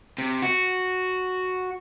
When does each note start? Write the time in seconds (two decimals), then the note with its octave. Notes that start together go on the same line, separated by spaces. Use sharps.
0.18 C3
0.42 F#4